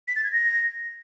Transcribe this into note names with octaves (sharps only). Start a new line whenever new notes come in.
B6
A6
G#6
A#6